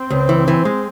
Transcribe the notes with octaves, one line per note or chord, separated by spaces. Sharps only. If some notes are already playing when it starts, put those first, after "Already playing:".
Already playing: C4
C#2
E3
E3
G#3